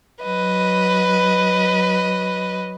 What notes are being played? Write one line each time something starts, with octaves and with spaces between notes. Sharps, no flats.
F#3 B4 D#5